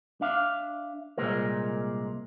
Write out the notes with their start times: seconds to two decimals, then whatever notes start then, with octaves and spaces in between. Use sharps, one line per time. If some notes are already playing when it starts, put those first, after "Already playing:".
0.21 D4 E5 F5
1.18 C2 A#2 G#3 A#4